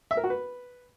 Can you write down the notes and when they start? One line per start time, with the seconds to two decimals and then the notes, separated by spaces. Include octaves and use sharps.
0.11 E5
0.17 A#4
0.24 F#4
0.30 B4